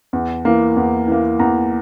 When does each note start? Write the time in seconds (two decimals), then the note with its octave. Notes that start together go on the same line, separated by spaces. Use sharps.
0.13 E2
0.45 E3 A#3
0.77 E2
1.08 E3 A#3
1.39 E2 A#5